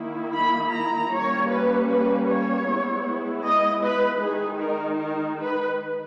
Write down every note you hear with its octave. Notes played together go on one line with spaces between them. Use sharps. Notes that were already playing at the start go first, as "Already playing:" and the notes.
Already playing: D#3 A#3 E4
B5
A#5
G3 A#3 C#4 C#5
B4
B4
C#5
G#3 B3 E4
D#5
B4
D#3 G#3 D#4 G#4
A#4
A#4
B4